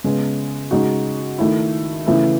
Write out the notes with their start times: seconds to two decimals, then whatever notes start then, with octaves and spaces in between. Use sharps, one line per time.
0.04 C#3 G#3 B3
0.71 C#3 G#3 D#4 F#4
1.38 D#3 A3 E4
2.07 C#3 E3 A3 E4